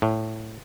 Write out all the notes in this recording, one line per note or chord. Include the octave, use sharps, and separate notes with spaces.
A2